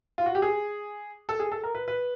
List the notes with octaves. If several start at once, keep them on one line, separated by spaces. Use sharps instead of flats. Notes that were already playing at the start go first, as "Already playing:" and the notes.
F4
F#4
G4
G#4
A4
G#4
A4
A#4
B4
B4